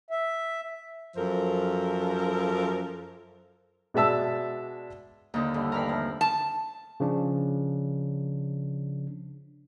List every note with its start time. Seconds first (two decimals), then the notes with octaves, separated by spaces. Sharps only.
0.11 E5
1.16 F#2 F3 A4 A#4 C5
3.94 B2 G#3 D4 E5 A5 E6
5.34 D#2 D3 D#4
5.54 G2 D3 E4
5.72 E3 G3 A3 A#4 F5 B5
5.89 C3 F3
6.21 A5
7.00 C#3 F3 D4